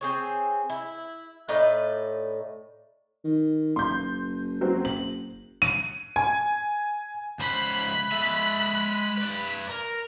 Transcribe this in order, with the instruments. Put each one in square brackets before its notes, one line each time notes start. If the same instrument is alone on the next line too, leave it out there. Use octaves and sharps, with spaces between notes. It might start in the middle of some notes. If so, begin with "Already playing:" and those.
[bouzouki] C4 G#4 C#5
E4
A2 D#4 B4 D5
[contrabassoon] D#3
[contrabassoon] F#1 [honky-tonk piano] C6 G6
[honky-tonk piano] F#3 C4
F#7
[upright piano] D#7
G#5
[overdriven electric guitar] C#2 C5 [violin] B5 F#6
[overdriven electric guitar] G#3 E5
B4 D5
A#4